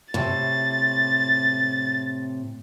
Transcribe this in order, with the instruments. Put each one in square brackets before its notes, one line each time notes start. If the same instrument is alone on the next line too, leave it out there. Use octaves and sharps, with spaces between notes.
[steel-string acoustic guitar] A2 C3 [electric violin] A6